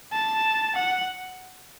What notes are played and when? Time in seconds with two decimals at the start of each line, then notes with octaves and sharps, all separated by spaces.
0.13 A5
0.75 F#5